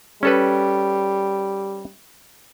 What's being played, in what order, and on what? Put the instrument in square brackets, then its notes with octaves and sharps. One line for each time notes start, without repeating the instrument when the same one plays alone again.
[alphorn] G3 [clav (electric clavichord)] C#4 A4 B4